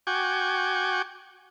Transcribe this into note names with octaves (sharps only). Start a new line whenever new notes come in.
F#4 G5 G#5 C#6 D6